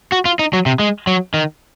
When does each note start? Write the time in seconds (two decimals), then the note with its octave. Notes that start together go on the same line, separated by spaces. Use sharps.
0.12 F#4
0.25 F4
0.39 D#4
0.53 F#3
0.66 C3
0.79 G#3
1.07 F#3
1.34 D#3